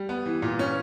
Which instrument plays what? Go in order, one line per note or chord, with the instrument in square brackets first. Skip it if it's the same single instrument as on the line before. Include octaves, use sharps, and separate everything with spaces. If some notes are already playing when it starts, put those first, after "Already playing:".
Already playing: [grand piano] G3
B3
E3
A#2
C#4